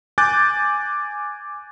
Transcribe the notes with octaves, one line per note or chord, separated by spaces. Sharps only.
G#5 D6 F#6 G6 A6